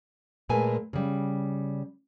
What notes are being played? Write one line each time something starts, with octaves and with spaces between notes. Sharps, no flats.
A#2 G#3 A3 B4 G#5
C#3 G3